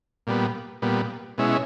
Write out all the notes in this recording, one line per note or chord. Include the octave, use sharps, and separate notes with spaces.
A#2 G3 B3
A#2 G3 B3
B2 G#3 C#4 E4